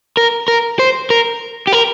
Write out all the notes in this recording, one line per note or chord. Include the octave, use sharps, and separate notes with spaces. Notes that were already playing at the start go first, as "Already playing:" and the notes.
A#4
A#4
C5
A#4
G4
A#4